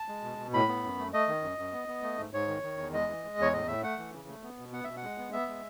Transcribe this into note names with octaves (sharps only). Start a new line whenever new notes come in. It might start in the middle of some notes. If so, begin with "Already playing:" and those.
Already playing: A5
G#3
B2
B2
A2 B5
B3
F#2
A3
A3 D#5
D#3
F#2
F#2
B3
B3
A3
G#2
G#2 C#5
D#3
D#3
E2
G#3 D#5
E3
G#3
E2 C#5
A2 D#5
A2 E5
A3 F#5
E3
C#3
A3
B3
B2
B3 F#5
B2 E5
F#5
G#3
B3
B3 E5
G#3